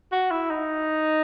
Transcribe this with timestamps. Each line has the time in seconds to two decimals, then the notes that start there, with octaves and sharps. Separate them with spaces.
0.12 F#4
0.31 E4
0.50 D#4